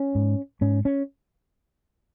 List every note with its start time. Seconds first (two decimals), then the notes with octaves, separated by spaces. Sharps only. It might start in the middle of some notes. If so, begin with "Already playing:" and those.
Already playing: C#4
0.15 G#2
0.61 G#2 C#4
0.85 C#4